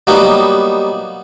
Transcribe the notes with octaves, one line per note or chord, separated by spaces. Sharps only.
F#3 G3 A#3 B3 D#4